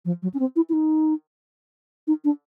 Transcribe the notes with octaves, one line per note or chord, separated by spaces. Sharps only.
F3
F#3
C#4
C4
E4
E4
D#4
D#4
D4